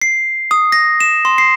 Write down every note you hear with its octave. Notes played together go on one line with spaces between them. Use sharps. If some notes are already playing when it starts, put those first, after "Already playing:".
C7
D#6
A#6
E7
C6
C7